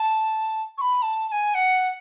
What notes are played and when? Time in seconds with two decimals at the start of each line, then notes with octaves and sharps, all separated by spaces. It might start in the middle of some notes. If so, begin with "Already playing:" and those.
Already playing: A5
0.78 C#6
0.81 B5
1.02 A5
1.29 A5
1.32 G#5
1.55 F#5